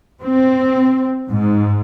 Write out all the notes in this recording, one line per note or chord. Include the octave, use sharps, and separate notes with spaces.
C4
G#2